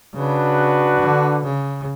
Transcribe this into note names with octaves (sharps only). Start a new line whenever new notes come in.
C#3 D4 F#4 B4
D3
C#3